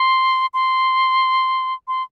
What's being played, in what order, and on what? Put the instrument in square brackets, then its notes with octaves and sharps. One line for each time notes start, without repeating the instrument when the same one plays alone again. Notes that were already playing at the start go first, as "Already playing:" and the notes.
Already playing: [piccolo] C6
C6
C6